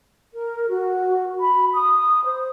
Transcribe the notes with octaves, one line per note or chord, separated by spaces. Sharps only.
A#4
F#4
B5
D#6
C5